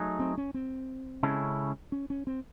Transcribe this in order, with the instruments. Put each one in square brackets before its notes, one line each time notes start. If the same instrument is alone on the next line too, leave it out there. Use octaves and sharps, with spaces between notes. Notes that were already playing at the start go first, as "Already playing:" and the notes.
Already playing: [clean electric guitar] F#3 A3 D#4 G#4
[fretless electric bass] C4
C#4
C4
[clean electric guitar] C#3 G#3 C#4 E4 A4
[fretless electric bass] C#4
C#4
C4